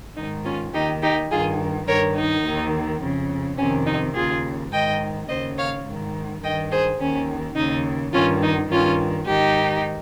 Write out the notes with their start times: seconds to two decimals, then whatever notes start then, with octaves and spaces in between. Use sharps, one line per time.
0.17 G#2 D#3 D#4
0.45 C#4 F4
0.73 D#2 D#3 D#4 G4
1.02 D#4 G4
1.30 G2 D#3 F4 G#4
1.87 G2 D#3 A#4 C#5
2.16 D#4
2.44 D#2
2.49 D#3
3.02 F2 C#3
3.58 F2 C3 D#3 C#4
3.86 D#4
4.15 D#2 C#3 F4 G#4
4.72 G#2 D#3 D#5 G5
5.29 D#2 C#3 C5 D#5
5.57 C#5 F5
5.86 G#2
5.91 D#3
6.42 G2 D#3 D#5 G5
6.71 G#4 C5
6.99 D#2 D#3 C#4
7.56 D#2 C#3 D#4
8.13 G2 D#3 C#4 F4
8.42 D#4
8.71 G2 D#3 C#4 F4
9.27 G#2 D#3 D#4 G4